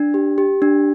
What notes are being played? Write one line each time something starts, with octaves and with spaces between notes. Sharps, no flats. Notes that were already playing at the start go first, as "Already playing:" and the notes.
Already playing: D4
G4
G4
D4